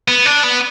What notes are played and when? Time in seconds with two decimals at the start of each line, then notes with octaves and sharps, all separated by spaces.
0.08 B3
0.26 D4
0.43 B3